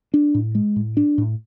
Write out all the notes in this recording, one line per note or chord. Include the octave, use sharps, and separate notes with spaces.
D4
A2
G#3
A2
D4
A2